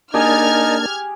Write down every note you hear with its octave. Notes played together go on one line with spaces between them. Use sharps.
A#3 D4 D#4 G4 G#4 A5 F6 G#6